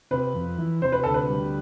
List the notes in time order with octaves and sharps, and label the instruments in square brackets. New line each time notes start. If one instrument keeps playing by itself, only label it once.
[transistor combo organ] C3 [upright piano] B4
[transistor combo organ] F2
E3
[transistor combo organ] C3 [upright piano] C5
[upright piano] B4
[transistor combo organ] D2 [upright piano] A4
[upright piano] B4
[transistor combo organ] G3